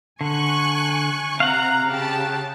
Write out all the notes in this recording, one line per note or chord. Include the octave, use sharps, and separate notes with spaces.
D3 G#5 C#6 F#6
C3 F5 F#5 A#5
C#3 G4 A5